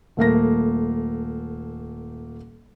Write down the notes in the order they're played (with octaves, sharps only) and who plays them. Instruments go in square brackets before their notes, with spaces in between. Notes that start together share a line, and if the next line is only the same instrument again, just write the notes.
[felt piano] D#1 A3 A#3 A#6